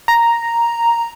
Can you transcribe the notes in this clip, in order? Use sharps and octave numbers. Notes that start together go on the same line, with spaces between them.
A#5